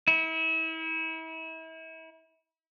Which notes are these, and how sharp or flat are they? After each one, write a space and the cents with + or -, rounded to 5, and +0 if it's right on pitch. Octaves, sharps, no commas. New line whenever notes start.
E4 -35